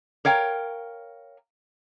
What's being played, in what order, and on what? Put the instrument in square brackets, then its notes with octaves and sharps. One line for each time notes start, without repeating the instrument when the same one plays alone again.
[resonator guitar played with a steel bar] A#4 C#5 F5 G5